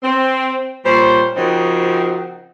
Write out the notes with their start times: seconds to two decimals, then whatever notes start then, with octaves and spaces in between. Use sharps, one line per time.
0.03 C4
0.85 A#2 G3 C#4 C5
1.36 C#3 F3 C4 D#4 F#4 A#4